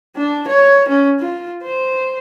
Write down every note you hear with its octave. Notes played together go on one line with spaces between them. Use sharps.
D4
C#5
C#4
F4
C5